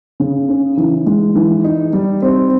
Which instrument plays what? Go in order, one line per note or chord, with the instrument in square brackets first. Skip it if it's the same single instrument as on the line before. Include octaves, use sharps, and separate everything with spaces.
[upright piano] C#3
C#4
E3
G#3
E3
D#4
G3
C4